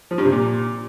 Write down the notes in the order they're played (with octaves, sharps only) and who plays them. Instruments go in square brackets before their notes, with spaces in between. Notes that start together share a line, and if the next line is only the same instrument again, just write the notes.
[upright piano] F3
G2
C3
A#2